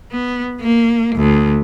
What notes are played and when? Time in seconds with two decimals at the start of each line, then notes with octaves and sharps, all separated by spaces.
0.11 B3
0.60 A#3
1.16 D2